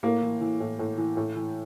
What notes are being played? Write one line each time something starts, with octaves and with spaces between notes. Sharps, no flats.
A2 A#3
E3
E3
A2
A2
E3
A2
E3